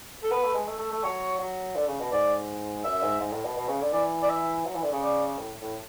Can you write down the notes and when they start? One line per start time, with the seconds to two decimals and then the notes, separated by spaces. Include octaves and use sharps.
0.23 A4
0.31 B3 B4
0.43 A3
0.54 G#3
0.68 A3
0.79 A3
0.92 A3
1.03 F#3 C#5
1.39 F#3
1.76 D3
1.88 C#3
2.00 B2
2.12 G#2 D5
2.84 F#2 E5
3.02 G#2
3.20 G#2
3.32 A2
3.45 B2
3.57 B2
3.68 C#3
3.81 D3
3.93 E3 D5
4.22 D5
4.29 E5
4.65 F#3
4.75 E3
4.83 D3
4.92 C#3
5.02 D5
5.39 A2
5.62 A2